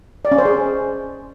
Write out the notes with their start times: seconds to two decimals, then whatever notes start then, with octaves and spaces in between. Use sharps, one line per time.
0.25 D5
0.32 C#4
0.38 C5
0.45 G#4